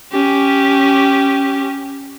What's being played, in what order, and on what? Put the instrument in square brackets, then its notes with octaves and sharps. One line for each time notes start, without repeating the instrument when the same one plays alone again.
[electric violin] C#4 G4